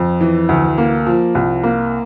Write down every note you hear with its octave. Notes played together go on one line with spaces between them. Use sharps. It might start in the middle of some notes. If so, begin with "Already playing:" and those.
Already playing: F2
E3
D2
A#3
F3
C2
A#3